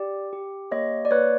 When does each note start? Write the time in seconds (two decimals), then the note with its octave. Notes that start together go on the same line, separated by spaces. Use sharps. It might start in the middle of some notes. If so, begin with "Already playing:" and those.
Already playing: G4 D5
0.33 G4
0.71 A#3 C#5 D#5
1.05 D5
1.11 A#3 B4 C#5